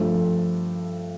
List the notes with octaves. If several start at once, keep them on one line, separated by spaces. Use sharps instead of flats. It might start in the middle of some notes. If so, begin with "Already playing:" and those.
Already playing: G2 F3 A3